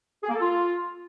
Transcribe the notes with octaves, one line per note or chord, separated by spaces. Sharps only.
G#4
A#3
A4
F4